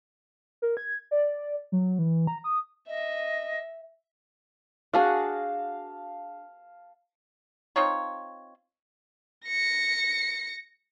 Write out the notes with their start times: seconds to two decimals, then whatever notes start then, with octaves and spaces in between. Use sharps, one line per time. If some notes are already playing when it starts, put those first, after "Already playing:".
0.62 A#4
0.77 G#6
1.11 D5
1.72 F#3
1.99 E3
2.27 A#5
2.44 D#6
2.88 D#5 E5
4.93 D4 F#4 G#4 F5 A5
7.76 C4 D#4 F4 C#5
9.46 A#6 C#7